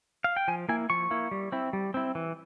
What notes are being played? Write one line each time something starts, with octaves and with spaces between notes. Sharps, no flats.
F5
G5
F3 G#5
A#3 E4 G#5
F3 C#6
A#3 E4
G3
C4 E4
G3
C4 E4
E3